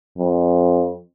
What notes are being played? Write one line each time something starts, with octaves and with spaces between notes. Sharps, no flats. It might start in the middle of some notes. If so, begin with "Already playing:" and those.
F2